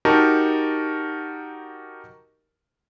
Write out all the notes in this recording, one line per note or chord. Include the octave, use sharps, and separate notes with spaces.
D#4 F#4 G4 A#4 A5